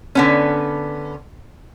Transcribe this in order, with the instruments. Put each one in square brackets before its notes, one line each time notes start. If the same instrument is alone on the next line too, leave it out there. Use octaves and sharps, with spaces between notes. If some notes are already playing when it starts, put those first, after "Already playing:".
[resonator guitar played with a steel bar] D3 B3 C#4